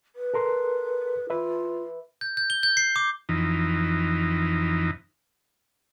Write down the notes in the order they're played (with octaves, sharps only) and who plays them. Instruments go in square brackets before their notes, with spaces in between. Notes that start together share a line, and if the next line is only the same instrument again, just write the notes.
[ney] B4
[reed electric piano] A4 A#4 C6
[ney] F4 [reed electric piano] B4 E5
[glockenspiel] G6
G6
G7
G6
C7
D6
[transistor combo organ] F2 E3 D#4